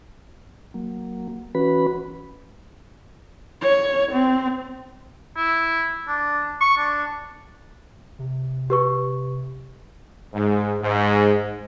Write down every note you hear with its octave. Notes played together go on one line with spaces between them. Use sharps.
F#3 A#3
E3 C#4 F#4 B4 B5
C#5
C4
E4
D4
C#6
D4
C3
G4 B4 C#6
G#2
G#2